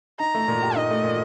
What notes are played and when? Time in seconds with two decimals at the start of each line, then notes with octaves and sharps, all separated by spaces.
0.20 D#4 A#5
0.35 A3
0.48 A#2
0.63 G4
0.76 D#4 D#5
0.90 A3
1.04 A#2